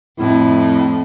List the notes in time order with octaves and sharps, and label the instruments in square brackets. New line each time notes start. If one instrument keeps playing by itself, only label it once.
[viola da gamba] F2 A2 [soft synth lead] E4